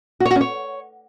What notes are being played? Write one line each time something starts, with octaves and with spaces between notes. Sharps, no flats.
F#4
C#5
F#4
C#4
C#5